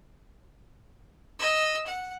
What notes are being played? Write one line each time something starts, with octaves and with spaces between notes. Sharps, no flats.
D#5 E6
F#5